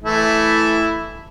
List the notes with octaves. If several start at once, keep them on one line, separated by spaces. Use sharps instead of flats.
E3 A3 E4